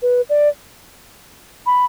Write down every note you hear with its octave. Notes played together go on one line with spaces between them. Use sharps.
B4
D5
B5